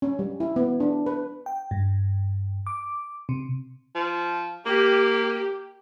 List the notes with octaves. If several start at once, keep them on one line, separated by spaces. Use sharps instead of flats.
C#4
G3
E4
B3
D4
B4
G5
G2
D6
C3
F3
A#3 G4